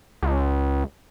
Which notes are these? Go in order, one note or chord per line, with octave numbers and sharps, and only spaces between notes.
C#2